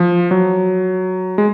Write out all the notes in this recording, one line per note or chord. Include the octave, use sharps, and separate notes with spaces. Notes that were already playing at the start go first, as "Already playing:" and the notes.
Already playing: F3
F#3
G#3